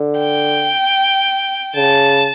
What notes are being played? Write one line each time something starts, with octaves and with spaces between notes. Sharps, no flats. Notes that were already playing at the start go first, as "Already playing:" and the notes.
Already playing: D3
G5
C#3 A5